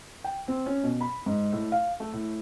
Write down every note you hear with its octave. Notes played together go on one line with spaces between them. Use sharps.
G5
C4
C#4
B2
B5
G#2
A2
F5
A3
A2